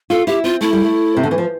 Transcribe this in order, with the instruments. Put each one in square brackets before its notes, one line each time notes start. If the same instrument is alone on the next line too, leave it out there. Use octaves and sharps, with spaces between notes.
[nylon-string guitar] F4 [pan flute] A4
[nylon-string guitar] E4 [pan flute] G4
[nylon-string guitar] C4 [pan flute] F4
[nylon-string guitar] A3 [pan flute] E4
[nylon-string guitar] G3
A3
C3
D3
E3
F3